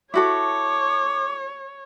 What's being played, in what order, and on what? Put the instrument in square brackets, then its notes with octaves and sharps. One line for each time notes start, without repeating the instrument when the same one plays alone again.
[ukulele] E4 F#4 A4 [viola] C#5 [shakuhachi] D6